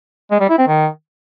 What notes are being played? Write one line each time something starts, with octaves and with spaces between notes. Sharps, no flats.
G#3
G3
E4
C4
D#3